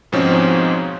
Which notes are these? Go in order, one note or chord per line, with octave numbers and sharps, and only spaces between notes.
G#2 B2 F3 C4 C#4 D#4